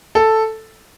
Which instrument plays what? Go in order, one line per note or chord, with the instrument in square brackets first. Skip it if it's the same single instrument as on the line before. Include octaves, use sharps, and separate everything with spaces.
[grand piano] A4